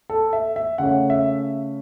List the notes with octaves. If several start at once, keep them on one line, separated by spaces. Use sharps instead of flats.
A4
E5
E5
C#3 A3 C#4 F#5
E5